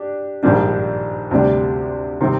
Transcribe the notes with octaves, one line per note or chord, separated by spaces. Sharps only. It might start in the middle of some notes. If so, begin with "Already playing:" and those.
Already playing: D4 G4
A#1 G#2 D#3 G3 D4
D2 C3 G3 D4 G4
C3 D#3 G3 C4